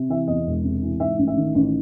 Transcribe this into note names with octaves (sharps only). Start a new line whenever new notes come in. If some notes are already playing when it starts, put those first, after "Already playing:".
Already playing: C3
E3 E5
E2 D#5
E1
C3
E3
G#2 E5
A1
E5
D#3
A1